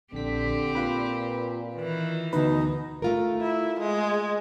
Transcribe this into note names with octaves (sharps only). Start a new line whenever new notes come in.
A#1 D3 C4 G4 B6
A#2 F4 B4 B5
D#3 E3
D2 B2 D#4 B4
A3 F4 A#4
E4
G#3